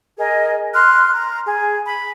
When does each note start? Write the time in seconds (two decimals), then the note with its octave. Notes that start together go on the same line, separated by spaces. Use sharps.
0.18 G#4 A#4 D#5
0.73 C6 F6 F#6
1.13 A#5
1.45 G#4
1.84 B5